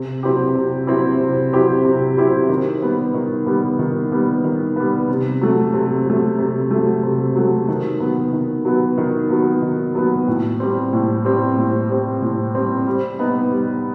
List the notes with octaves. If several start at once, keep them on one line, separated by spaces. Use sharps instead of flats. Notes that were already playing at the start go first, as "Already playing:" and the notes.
Already playing: C3
F#3 C4 E4 G4
C3
F#3 C4 E4 G4
C3
F#3 C4 E4 G4
C3
F#3 C4 E4 G4
D#3
G3 B3
D#3
G3 B3
D#3
G3 B3
D#3
G3 B3
C3
F#3 A3
C3
F#3 A3
C3
F#3 A3
C3
F#3 A3
D#3
F#3 B3
D#3
F#3 B3
D#3
F#3 B3
D#3
F#3 B3
A2
G3 C4
A2
G3 C4
A2
G3 C4
A2
G3 C4
G3
B3 D#4
G3